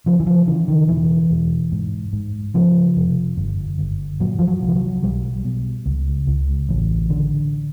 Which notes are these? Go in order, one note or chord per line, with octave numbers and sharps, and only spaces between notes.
C#3 F3
E3
F3
C#3 E3
D#3
E1 E3
E1
G#2
G#2
C#3 F3
F1
G1
G1
A#2 F#3
F3
F#3
C2
F3
F#3
B1 G3
B2
C#2
C#2
A1
D3